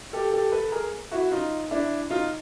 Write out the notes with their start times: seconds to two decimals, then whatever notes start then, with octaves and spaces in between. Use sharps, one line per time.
0.13 G4 A4
0.33 G4 A4
0.52 A4 B4
0.72 G#4 A#4
1.11 E4 F#4
1.31 D#4 F4
1.71 D4 E4
2.10 D#4 F4